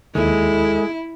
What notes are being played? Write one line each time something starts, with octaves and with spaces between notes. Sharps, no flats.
D#2 D#3 G#3 E4 A4